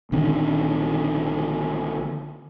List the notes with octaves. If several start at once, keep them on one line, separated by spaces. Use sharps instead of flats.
A#1 D3 D#3 C4